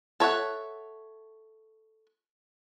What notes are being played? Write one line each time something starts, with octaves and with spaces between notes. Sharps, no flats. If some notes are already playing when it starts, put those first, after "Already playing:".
A4 C#5 E5 F#5